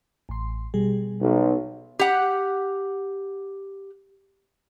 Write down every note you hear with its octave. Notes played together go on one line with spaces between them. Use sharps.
A1 C6
B2 G3 G#4
B1
G4 F#5